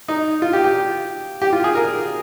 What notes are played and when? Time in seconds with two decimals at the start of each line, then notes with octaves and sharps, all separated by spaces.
0.08 D#4
0.42 F4
0.53 G4
0.64 G4
1.42 G4
1.53 F4
1.64 G#4
1.75 A#4